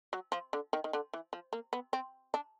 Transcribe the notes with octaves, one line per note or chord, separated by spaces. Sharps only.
F#3
F3
D3
D#3
D#3
D3
E3
F3
A#3
B3
C4
D4